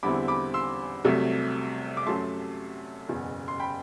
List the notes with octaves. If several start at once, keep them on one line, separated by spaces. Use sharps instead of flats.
E2 D3 G3 C4 E4 B5 D6
B5 D6
C6 E6
C2 C3 F#3 A3
D6
F#2 F#3 A3 A5 C6
F#1 E2 B2
C6
G5 B5